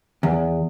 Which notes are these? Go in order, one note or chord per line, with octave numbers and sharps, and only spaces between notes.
E2